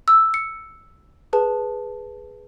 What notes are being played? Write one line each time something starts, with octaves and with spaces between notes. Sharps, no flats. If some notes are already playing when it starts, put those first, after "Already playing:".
E6
C#7
G#4 B4 A5